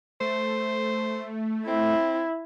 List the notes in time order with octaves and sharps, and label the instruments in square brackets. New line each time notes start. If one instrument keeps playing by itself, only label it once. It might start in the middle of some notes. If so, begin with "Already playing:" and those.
[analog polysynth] A3 [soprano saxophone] C5
[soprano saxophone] C4 [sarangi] E4